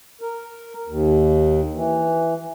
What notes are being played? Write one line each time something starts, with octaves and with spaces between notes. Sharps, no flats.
A#4
D#2
E3